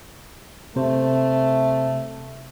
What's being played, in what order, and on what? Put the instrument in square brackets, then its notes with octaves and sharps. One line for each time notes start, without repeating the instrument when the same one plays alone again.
[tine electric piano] C3 C5 [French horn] A3